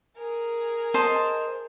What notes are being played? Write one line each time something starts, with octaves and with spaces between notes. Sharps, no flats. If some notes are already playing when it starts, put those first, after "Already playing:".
G#4 A#4
C5 D#5 A5